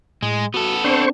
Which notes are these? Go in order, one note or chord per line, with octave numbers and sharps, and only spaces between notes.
A2 G#3
B3 F#4 A4
C4 D4 C5 C#6